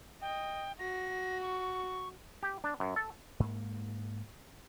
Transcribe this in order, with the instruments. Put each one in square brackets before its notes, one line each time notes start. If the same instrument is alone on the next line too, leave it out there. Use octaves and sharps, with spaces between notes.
[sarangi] D#5 [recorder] G5
[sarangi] F#4 [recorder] A#6
[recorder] C#6
[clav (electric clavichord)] G4
D4
F#2
A4
[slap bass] G#2 A#3